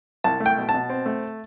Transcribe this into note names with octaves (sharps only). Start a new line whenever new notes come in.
C2 A5
A3
G5
B2
A5
B2
C4
A3